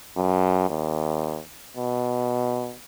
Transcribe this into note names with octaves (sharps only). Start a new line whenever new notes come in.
F#2
D#2
B2